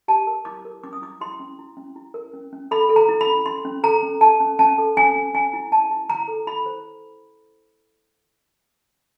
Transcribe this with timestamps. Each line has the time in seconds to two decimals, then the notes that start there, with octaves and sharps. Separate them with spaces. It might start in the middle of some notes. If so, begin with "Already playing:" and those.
0.08 G4 A5
0.27 A#4
0.45 E4 D6
0.65 A#4
0.84 C#4 D6
0.93 D#6
1.02 E4 D6
1.21 E4 C6
1.40 C#4
1.59 E4
1.77 C#4
1.96 E4
2.14 A#4
2.33 C#4
2.53 C#4
2.71 A4 B5
2.89 A4
2.96 A#5
3.09 E4
3.21 B5
3.27 C#4
3.46 C#4 C6
3.65 C#4
3.83 A4 A#5
4.03 C#4
4.21 A4 A5
4.40 C#4
4.59 C#4 A5
4.78 A4
4.97 C#4 G#5
5.16 C#4
5.34 C#4 G#5
5.53 E4
5.71 E4 A5
5.91 E4
6.09 E4 A#5
6.28 A4
6.47 E4 B5
6.66 C5